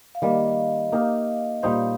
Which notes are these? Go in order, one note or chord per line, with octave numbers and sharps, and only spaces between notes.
F5
D#3 G3 A#3 D#5
A#3 D#4 G4 A#4
A#2 G3 D#4 C5 F5